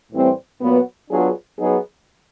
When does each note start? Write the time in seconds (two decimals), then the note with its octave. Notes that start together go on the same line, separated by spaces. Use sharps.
0.12 A2 E3 G3 C4
0.61 A#2 F#3 B3
1.10 F#3 B3 D4 F4 G#4
1.59 F#3 B3 D#4 G#4